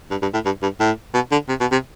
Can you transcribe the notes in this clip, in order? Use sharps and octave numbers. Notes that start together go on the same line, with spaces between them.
G2
G2
A2
G2
G2
A2
B2
D3
C3
B2
C3